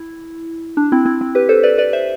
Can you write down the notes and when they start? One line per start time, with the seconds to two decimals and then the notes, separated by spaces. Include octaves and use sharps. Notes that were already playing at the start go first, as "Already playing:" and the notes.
Already playing: E4
0.77 D4
0.92 C4 E4
1.05 C4 E4
1.21 C4
1.35 G4 B4
1.49 A4 C5
1.63 B4 D5
1.78 B4 D5
1.93 C5 E5